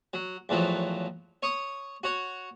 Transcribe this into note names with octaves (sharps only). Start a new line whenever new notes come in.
F#3
E2 A2 F3 F#3
C#5 C#6 D#6
F#4 C#5